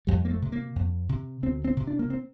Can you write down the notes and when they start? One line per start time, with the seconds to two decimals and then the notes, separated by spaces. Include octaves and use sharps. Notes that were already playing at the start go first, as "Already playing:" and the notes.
0.07 F2 G3
0.25 A#3
0.31 A3
0.42 C3
0.52 A#3
0.76 F2
1.09 C3
1.43 D2 C4
1.64 C4
1.77 C3
1.87 D4
1.99 A#3
2.10 C4